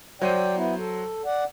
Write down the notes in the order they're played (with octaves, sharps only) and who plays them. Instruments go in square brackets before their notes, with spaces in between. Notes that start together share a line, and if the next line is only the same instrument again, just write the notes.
[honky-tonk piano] F#3 C5 D#7 [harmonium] D5 G5
[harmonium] B3 E4
A4
D5 F#5